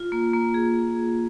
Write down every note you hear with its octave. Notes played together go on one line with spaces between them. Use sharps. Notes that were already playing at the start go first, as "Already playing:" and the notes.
Already playing: F4
A#3
A#3
G#4